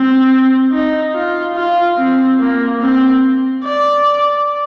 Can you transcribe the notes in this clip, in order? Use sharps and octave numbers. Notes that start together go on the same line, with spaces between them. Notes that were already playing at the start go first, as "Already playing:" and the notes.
Already playing: C4
D#4
F4
F4
C4
A#3
C4
D5